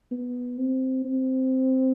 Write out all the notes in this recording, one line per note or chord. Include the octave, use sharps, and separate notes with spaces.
B3
C4
C4